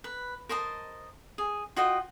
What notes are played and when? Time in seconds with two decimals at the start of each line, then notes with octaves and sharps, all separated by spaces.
0.04 B4
0.49 A#4 C5 D#5 A5
1.38 G#4
1.76 F4 F#4 D#5 G5